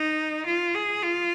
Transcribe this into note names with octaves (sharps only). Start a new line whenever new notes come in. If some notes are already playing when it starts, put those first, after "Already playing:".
Already playing: D#4
F4
G#4
F4